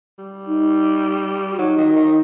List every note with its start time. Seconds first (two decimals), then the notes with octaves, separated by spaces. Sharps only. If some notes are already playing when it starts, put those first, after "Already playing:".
0.18 G3
0.46 D#4
1.51 F#4
1.59 F#3 D#4
1.78 D#3
1.96 D#3